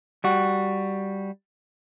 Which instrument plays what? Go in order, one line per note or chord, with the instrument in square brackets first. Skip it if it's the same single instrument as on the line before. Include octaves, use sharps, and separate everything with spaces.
[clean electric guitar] G3 F#4